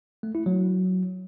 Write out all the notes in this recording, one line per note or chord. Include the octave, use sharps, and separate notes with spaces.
A3
E4
F#3